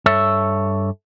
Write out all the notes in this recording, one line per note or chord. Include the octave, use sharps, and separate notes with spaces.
G2 A4 C#5 E5